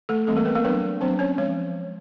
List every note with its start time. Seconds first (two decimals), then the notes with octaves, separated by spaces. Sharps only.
0.09 A3 A4
0.27 E3 G3 A3 C4 A4
0.36 A#3 A#4
0.45 B3 B4
0.55 A#3 A#4
0.64 F#3 B3 D4 B4
1.01 F#3 B3 C4 D4 C5
1.19 C#4 C#5
1.38 F3 G#3 C#5